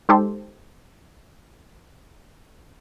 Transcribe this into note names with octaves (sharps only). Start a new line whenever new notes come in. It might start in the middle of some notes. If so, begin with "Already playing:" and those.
G#3 D#4 G4 A4 C5